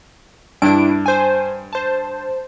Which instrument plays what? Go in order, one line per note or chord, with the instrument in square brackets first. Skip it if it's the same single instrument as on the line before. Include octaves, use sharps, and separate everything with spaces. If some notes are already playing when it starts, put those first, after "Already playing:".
[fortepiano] G2 [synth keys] D4 E4 D7
[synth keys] C5 G#5
C5 A5